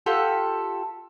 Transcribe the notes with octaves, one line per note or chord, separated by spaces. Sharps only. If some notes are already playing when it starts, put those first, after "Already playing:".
F4 G4 A4 F#5